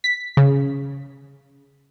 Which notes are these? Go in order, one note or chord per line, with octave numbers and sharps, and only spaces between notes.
B6
C#3